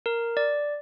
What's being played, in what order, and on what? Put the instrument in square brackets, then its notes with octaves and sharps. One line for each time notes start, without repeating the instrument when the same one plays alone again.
[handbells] A#4
D5